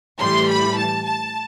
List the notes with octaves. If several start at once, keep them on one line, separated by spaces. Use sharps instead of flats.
A2 E3 G3 C6
B5
A5
A5